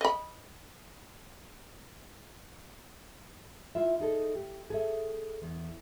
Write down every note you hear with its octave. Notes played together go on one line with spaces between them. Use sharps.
D#5 B5
E4 F4 E5
D#4 G#4 A4
G4
G#4 A4 E5
E2